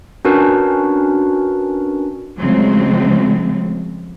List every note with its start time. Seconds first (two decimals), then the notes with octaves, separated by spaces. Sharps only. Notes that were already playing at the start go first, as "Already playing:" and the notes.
0.25 C#4 D4 F#4 A#4 B4
2.39 C#3 F3 F#3 G#3 A3 C4